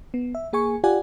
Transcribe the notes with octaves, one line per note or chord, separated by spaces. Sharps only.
B3
E5
A#3 G#4 G#5 C#6
F4 G4 D5 F#5 G#5